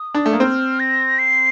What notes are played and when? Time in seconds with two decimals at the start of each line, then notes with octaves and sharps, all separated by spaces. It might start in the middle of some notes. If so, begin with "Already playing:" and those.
Already playing: D#6
0.14 D4
0.26 A3
0.33 A#3
0.40 C4 F6
0.80 A#6
1.19 C7